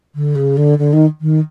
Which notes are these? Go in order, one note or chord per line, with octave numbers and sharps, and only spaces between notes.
D3
C#3
D3
D3
D#3
D#3